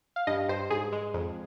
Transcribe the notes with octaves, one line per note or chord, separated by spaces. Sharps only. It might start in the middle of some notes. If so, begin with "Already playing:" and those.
F5
G2 D#5
G2 C5
G#2 G#4
G#3
F2